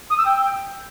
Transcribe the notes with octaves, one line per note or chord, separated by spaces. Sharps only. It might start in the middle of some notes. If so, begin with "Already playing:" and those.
D#6
E6
G5